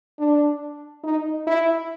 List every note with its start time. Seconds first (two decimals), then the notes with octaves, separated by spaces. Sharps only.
0.19 D4
1.04 D#4
1.47 E4